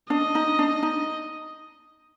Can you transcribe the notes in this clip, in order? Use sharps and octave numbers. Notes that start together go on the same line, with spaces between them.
D4 D#5
D#4
D4
D#4